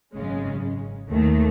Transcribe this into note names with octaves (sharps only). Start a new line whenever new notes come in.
G#1 F#2 C#3 G#3 C#4
D#2 D#3 A3